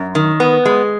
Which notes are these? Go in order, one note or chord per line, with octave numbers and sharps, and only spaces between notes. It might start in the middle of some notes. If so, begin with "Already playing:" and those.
Already playing: F#2
D#3
B3
G#3